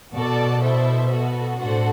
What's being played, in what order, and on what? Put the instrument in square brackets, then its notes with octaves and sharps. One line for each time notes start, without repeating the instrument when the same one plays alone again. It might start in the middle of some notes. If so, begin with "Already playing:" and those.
[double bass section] B2 [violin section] F#4 A4 D5 A5
[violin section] E4 A4 C5 E5
B3 F#4 A4
[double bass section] A2 [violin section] D4 F#4 A4 C5 F#5